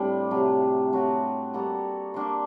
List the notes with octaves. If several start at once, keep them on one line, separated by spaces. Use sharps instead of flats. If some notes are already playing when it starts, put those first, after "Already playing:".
Already playing: A2 G3 C4 D4
C3 F#3 A3
F#3 A3 C4 F#4
G3 A#3 F#4 A4
A#3 D4 G4 C5